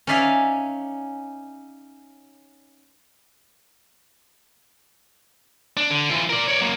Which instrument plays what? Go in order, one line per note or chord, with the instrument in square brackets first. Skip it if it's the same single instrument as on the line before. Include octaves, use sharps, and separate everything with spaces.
[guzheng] C#4 D#4 D5 E5 F5 G#5
[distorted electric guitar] D4
D3
E3 F4
A#4 D5
C#5 D5
F#3 A#3